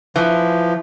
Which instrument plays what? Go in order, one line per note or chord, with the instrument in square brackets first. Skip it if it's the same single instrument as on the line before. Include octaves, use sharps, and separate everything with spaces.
[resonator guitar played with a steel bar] E3 [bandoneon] F3